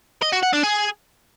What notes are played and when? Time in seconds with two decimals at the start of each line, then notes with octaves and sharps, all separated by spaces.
0.23 D#5
0.33 F#4
0.43 F#5
0.53 D4
0.64 G#4